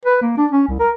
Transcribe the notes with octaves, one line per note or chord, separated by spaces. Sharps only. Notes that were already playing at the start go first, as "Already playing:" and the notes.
B4
A#3
D4
C#4
C2
A#4